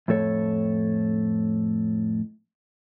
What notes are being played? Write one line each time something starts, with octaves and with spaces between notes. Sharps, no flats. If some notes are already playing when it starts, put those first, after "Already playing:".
F2 A2 A4 C#5